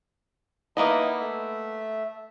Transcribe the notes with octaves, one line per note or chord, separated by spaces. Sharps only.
A#3 B3 D#4 E4 D#5
A3 E5